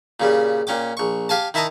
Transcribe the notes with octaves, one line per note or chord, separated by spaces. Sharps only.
A#2 C#3 G3
A#2 C#4 G5 D6
A#1 C#6
G4 F5 G#5 A5
D#3 E4 E5 A5 A#5 D#6